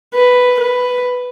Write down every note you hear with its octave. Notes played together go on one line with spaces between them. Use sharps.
B4
B4